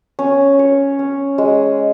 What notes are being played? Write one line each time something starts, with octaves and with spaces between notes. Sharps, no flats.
C#4
C#5
C#4
G#3